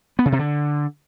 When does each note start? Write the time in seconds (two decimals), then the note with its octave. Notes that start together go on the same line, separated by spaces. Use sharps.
0.19 B3
0.26 C#3
0.32 C3
0.39 D3